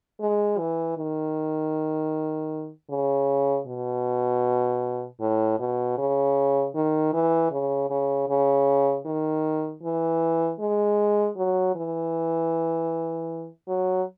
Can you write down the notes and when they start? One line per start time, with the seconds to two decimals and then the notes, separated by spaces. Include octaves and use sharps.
0.21 G#3
0.59 E3
0.97 D#3
2.90 C#3
3.67 B2
5.20 A2
5.60 B2
5.98 C#3
6.75 D#3
7.13 E3
7.52 C#3
7.90 C#3
8.28 C#3
9.06 D#3
9.83 E3
10.60 G#3
11.36 F#3
11.75 E3
13.68 F#3